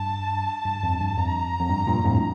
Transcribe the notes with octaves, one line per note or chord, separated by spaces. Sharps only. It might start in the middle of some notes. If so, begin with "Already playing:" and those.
Already playing: G2 A5
G2
F2
G2
F2 A#5
F2
G2
G2 A#2
F2 A2